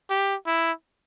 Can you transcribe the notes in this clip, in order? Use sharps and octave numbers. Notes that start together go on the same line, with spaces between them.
G4
E4